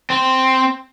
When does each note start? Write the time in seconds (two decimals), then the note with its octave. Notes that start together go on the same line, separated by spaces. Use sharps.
0.10 C4